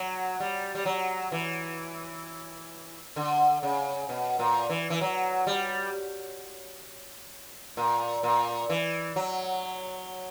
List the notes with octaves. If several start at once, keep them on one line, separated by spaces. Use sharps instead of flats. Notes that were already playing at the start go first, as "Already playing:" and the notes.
Already playing: F#3
G3
G3
F#3
E3
D3
C#3
B2
A#2
E3
E3
F#3
G3
A#2
A#2
E3
F#3